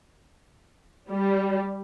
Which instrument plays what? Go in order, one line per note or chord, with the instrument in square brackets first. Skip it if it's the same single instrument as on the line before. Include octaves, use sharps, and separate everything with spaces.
[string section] G3